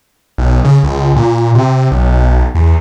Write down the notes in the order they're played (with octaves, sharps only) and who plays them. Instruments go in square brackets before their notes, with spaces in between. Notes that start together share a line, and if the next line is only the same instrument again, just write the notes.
[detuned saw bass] B1
C#3
C#2
A#2
C3
B1
E2